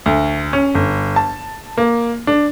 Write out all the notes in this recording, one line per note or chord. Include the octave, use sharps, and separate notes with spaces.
D2
C#4
G1
A5
A#3
D4